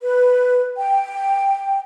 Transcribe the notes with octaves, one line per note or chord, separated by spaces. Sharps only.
B4
G5